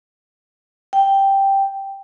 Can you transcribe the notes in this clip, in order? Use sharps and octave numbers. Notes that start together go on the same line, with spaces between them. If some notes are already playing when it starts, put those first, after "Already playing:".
G5